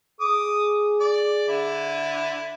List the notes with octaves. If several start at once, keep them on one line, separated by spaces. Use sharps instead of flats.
G#4 D6 D#6
D5
D3 E4